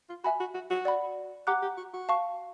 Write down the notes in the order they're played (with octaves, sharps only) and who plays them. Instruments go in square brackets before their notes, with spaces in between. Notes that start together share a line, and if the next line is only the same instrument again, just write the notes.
[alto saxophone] F4
[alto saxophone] F#4 [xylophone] E5 G#5 B5
[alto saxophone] F#4
F#4
F#4
[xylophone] D5 F#5 B5
[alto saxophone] G4 [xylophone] F#5 A#5 D6 F#6
[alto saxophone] G4
F#4
F#4
[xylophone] F5 A5 C#6